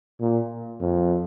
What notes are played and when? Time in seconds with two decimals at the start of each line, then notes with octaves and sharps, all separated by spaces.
0.21 A#2
0.81 F2